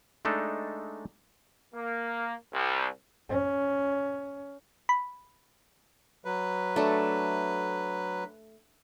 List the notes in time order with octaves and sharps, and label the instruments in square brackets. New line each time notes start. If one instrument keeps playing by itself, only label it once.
[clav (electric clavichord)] G#3 A3 D4 D#4 A4
[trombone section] A#3
C2
[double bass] C#4
[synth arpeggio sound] B5
[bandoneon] F#3 B4
[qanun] A3 D4